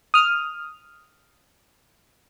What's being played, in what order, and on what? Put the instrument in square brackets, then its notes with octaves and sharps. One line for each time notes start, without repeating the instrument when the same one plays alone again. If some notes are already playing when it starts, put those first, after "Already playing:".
[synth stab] D#6 F6